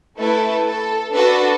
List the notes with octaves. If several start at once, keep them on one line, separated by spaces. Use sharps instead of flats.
A3 E4 A4 B4
A4
D4 F#4 A4 B4